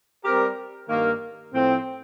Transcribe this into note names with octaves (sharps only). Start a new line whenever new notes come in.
G3 C4 G4 A#4
G2 D#3 A#3
A2 F3 C4